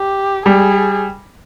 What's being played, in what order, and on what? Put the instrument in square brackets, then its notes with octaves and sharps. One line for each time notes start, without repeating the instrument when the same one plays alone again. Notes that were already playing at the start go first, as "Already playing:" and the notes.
Already playing: [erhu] G4
[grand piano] G3 [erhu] G#4